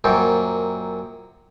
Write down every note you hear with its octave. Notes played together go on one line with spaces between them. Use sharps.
F#2 A#2 C4